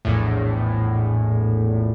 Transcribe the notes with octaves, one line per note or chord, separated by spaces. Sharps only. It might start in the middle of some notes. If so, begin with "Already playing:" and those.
A#1 E2 A2